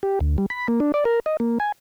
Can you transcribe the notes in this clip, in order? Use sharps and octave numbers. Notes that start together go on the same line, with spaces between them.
G4
D2
G3
B5
A#3
D4
D5
A#4
D#5
A#3
G#5